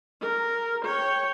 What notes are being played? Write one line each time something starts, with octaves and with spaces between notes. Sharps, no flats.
A#4
C#5 G5